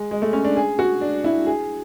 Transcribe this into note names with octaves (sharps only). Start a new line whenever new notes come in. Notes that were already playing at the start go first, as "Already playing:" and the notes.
Already playing: G#3
G#3
A3
C#4
D4
G#4
F#4
D4
E4
G#4